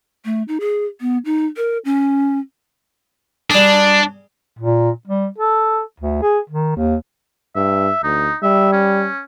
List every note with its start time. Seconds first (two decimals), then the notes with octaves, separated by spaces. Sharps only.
0.25 A3
0.48 D#4
0.60 G#4
1.01 B3
1.25 D#4
1.57 A#4
1.85 C#4
3.51 G3 D4 G#4
4.59 A#2
5.07 G3
5.38 A4
6.00 D2
6.22 G#4
6.50 D#3
6.76 D#2
7.56 G2 E5
8.03 D2 D#4
8.43 G3 E5
8.72 C#4